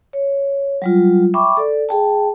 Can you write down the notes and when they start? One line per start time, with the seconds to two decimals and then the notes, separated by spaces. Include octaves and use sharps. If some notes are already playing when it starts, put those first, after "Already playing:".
0.13 C#5
0.82 F#3 G3 F4
1.34 E5 G5 B5 C#6 D6
1.57 A4 D5
1.89 G#4 G5 A5